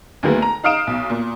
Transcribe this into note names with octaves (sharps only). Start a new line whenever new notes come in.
D2 D#3 F#3 G#3 A#3 B3
A#5
D#4 F5 D#6 D7 E7
B1
A#2